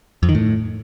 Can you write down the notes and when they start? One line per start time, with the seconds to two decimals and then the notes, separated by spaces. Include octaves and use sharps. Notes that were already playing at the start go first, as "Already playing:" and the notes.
0.23 F2
0.29 D#3
0.35 A2